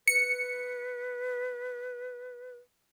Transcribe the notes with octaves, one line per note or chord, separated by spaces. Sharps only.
B4 C#7